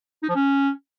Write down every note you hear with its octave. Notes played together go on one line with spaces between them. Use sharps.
D#4
F3
C#4